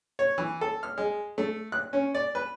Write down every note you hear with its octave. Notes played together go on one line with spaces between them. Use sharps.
C#5
E3
A4
F6
G#3
A3
F#6
C#4
D5
B4